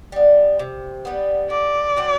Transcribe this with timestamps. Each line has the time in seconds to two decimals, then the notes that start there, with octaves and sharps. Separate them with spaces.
0.12 G3 B3
0.59 C3
1.05 G3 B3
1.50 D3 D5
1.96 F#3 C4 F#4